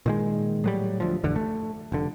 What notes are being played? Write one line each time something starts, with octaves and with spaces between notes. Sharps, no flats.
A#2 D#3 G#3
A2 F#3 G3
D2 F3
A1 F2 D3
A3
F1 D3